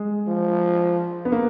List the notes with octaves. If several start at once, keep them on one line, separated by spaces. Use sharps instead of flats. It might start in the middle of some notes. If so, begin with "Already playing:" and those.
Already playing: G#3
F3
B3
A#3